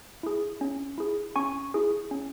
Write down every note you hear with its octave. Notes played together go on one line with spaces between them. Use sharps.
E4 G#4
C#4
E4 G#4
C#4 G#5 C#6
E4 G#4
C#4